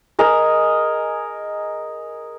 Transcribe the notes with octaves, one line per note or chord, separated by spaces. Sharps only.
G#4 A#4 D#5